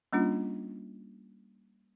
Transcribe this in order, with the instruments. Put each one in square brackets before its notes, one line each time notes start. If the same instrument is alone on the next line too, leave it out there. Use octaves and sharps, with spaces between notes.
[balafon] G3 A#3 C#4 D4 F4